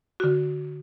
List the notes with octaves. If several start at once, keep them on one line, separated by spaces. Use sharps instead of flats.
D3 F#4